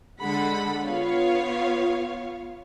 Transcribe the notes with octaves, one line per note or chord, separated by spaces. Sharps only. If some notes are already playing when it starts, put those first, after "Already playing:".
D3 G#3 A4 F#5 B5
B3 F4 C#5 F5